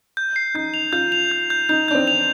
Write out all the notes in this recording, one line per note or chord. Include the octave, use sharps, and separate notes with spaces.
G6
C7
D#4 G6
F7
F4 G6
F7
G6
G6
D#4 G6
D4 G6
C4
F7